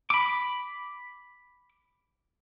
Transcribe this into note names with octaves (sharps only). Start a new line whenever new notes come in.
B5 D6